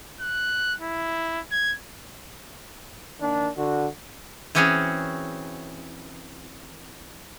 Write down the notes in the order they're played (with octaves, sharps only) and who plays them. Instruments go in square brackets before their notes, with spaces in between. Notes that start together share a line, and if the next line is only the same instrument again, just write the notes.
[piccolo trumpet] F#6
E4
G#6
[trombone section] D#3 A#3 D4
D3 F#4
[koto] E3 C4 C#4 F#4 G#4 C#5